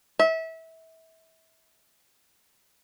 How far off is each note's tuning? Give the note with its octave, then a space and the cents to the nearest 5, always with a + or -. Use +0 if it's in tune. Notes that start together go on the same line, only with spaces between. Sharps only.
E5 -25